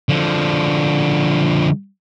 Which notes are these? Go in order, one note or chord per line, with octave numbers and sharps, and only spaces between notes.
D3 F3